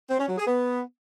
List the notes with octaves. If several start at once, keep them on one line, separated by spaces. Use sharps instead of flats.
C4
C#4
F#3
G#4
B3